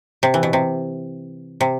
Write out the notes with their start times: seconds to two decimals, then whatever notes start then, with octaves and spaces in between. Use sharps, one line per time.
0.23 C3
0.34 E3
0.43 B2
0.53 C3
1.61 C3